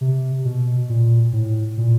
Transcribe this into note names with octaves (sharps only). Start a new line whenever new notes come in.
C3
B2
A#2
A2
A#2